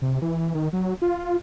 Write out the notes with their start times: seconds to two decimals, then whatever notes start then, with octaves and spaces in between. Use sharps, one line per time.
0.02 C3
0.22 E3
0.55 D#3
0.73 F#3
1.02 F4